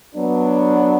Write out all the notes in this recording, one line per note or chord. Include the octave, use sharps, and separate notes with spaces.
F#3 B3 D4